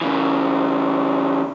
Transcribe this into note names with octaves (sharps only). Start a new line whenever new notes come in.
C#3 E3